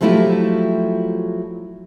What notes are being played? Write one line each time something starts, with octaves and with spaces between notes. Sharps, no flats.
F3 F#3 A3 E4 F4 G4